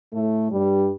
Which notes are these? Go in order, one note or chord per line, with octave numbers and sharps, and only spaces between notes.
A2 A3
G2 G3